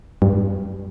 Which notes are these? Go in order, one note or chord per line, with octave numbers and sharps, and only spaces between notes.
G2